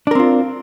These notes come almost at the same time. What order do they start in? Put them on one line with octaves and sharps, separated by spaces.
D4 A#4 C4 F4